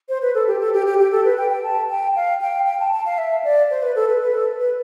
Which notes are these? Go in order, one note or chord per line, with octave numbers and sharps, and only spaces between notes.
C5
B4
A4
G4
A4
G4
G4
G4
A4
B4
G5
G5
A5
G5
F5
G5
G5
A5
A5
F5
E5
D5
C5
B4
A4
B4
B4
A4
B4